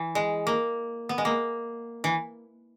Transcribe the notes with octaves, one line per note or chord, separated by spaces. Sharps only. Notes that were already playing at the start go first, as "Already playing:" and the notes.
Already playing: E3
G#3
A#3
B3
G#3
A#3
E3